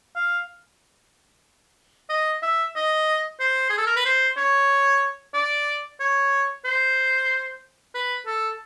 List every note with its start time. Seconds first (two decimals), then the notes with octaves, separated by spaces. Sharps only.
0.16 F5
2.10 D#5
2.43 E5
2.76 D#5
3.40 C5
3.70 G#4
3.78 A4
3.87 A#4
3.97 B4
4.05 C5
4.37 C#5
5.34 D5
6.00 C#5
6.65 C5
7.95 B4
8.26 A4